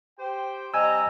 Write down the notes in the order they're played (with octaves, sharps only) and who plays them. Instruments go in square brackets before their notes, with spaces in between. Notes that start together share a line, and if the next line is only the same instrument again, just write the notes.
[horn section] G4 C5 G5
[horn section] G3 C4 A#5 [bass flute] D#5 [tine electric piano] G#5 E6